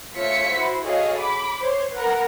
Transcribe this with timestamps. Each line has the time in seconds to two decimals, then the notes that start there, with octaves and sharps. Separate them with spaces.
0.16 A3 F4 C#5 E5 B6 C#7
0.52 E4 F#4 C5
0.86 F#4 G#4 A4 C#5 D#5 F5
1.19 B5 D6
1.61 C5 C#5 C6
1.93 A#4 B4 F#5